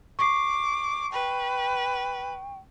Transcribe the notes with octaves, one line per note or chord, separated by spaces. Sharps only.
C#6 D6 C7
B4 G5